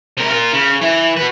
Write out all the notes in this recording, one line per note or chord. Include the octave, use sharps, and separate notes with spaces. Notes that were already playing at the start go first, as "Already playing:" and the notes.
C3 A#4
F4 A#4
C#3
E3
F#4 B4